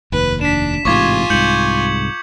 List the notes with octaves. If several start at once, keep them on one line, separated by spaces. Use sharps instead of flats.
F1 D#2 B4
D4 B6 E7
A1 G#2 C3 F4 G#5 C#6 D6 G#6
C2 G#2 G6 C#7 F#7